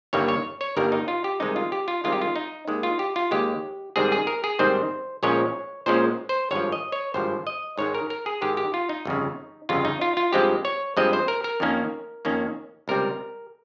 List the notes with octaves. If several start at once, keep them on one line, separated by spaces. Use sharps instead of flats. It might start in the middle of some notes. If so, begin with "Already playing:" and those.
G1 G2 D#3 G3 A#3 C#5
C#5
C#5
G1 G2 D#3 G3 A#3 A#4
D#4
F4
G4
C2 C3 D#3 G#3 D#4
F4
G4
F4
C2 C3 D#3 G#3 F4
G4
F4
D#4
D#2 D#3 G#3
F4
G4
F4
D#2 D#3 G#3 G4
G#2 D#3 G3 C4 G#4
G#4
A#4
G#4
G#2 D#3 G3 C4 C5
A#1 A#2 F3 G#3 C#4 C#5
A#1 A#2 F3 G#3 C#4 C5
C5
G#1 G2 F3 C#5
D#5
C#5
G#1 G2 F3 C5
D#5
G#2 D#3 G#3 C#5
A#4
A#4
G#4
G#2 D#3 G#3 G4
G4
F4
D#4
G1 F2 C#3
G1 F2 C#3 F4
D#4
F4
F4
G2 F3 G#3 C4 G4
C#5
G2 F3 G#3 C4 D#5
C5
A#4
A#4
F2 D#3 A#3 C#4
F2 D#3 A#3 C#4
C#2 C3 G3 C4 A#4